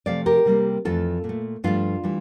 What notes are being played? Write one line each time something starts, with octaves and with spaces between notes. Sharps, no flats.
C3 F3 A3 D5 F5
G4 A#4
C3 G3 A#3
F2 E3 A3 F4 A4
A#2
A3
G2 F3 A3 D4 F4
E3 G3